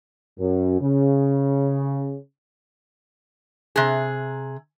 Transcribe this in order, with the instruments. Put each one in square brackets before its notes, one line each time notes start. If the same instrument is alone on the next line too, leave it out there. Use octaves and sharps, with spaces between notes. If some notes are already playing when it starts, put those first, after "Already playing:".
[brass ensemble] F#2
C#3
[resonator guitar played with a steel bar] C3 G#4